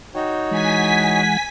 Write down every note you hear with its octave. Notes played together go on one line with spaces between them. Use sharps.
D#4 F#4 C#5 G5
E3 G#3 F#5 G#5 B6